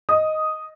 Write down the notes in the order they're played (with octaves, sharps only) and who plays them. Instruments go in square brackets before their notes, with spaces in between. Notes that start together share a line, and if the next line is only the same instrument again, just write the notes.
[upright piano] D#5 D#6